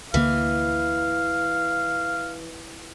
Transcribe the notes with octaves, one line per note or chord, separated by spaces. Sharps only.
D2 D3 E3 A#3 F5